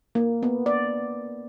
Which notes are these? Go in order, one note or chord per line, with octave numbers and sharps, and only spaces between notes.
A#3
B3
D5